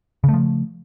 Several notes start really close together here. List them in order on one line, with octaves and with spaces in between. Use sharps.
C#3 A3 F3